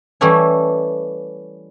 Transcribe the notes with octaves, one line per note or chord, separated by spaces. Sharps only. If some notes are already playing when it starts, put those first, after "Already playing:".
E3 G3 A3 C#4 E4